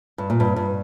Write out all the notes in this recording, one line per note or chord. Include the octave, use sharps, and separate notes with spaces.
G2
A#2
G2
G2